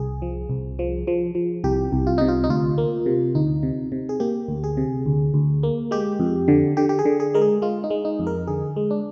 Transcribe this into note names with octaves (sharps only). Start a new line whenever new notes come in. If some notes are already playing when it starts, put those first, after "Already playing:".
Already playing: C2 G#4
F3
C2
F3
F3
F3
C2 G4
C2
F4
C3 D#4
F4
D#4
D2 F4
A#3
C3
D2 D#4
C3
C3
G#4
A#3 G4
D2
G#4
C3
D2
D2
A#3
G#3 G4
F2
D3
D3 G4
G4
G#4
D3
G#4
G#3 A#4
G#4
G#3 F4
D#4
G#3
D#4
F2
A#4
D3 G#4
G#3
D4